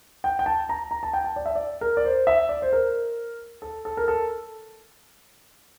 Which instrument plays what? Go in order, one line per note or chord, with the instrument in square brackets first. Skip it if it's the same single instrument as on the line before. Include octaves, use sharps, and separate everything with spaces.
[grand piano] G5
G5
A5
A#5
A#5
A5
G5
A5
D5
E5
D5
A#4
D5
C5
E5
D5
C5
A#4
A4
A4
A#4
A4